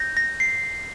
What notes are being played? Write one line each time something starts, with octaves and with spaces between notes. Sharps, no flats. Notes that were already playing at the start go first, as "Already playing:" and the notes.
Already playing: G6 A#6
A#6
C7